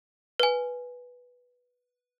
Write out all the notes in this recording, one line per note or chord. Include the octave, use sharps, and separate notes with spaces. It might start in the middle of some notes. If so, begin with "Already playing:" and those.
B4 G#5